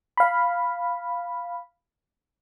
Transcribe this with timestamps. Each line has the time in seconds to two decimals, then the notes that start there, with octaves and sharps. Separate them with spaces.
0.17 F5 B5